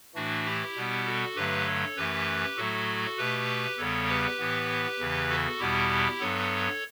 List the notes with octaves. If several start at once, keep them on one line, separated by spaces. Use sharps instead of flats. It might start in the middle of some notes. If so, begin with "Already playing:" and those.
A2 E3 A3 D4 F#4
E4 G4
B2 G3 B3
F#4 A4
G2 D3 F#3 A3 G4 B4
A4 C#5
F#2 E3 A3 G4 B4
A2 F#3 A3 F#4 A4
B2 A3 G4 B4
E2 C#3 G3 B3 A4 C#5
G4 B4
A2 E3 B3
E2 C#3 E3
F#4 A4
E2 B2 G3 B3 E4 G4
G2 F#3 B3 A4 C#5